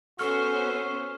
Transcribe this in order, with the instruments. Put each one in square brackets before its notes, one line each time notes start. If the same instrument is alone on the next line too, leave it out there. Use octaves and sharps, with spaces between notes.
[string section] B3 C#4 C5 [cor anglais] F#4 [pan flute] A4 [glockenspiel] C#6 F6